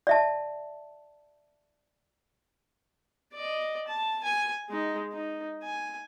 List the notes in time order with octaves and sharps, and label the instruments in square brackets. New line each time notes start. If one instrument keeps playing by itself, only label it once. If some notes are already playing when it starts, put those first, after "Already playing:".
[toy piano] D5 E5 A5
[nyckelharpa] D5 D#5
A5
G#5
G#3 D#4
D#4
G#5